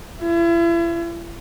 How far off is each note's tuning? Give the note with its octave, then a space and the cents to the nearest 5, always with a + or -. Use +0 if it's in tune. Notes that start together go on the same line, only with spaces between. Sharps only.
E4 +40